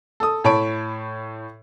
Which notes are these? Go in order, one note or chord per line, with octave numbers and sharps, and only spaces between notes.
A4 D#6
A2 C#5 A5 B5 D7